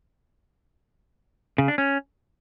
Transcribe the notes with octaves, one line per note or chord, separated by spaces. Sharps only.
C#3
D4
C#4